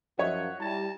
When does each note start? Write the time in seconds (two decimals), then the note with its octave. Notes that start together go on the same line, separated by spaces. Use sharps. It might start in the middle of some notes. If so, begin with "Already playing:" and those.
0.19 F#2 F3 F#4 C#5 D#5 E5
0.60 G3 E4 A5